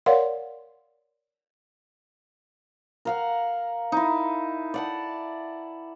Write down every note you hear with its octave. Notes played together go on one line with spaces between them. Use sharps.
A#4 C#5 D5 F5 F#5 C6
A#4 F5 F#5
D#4 E4
D5 F#5 A5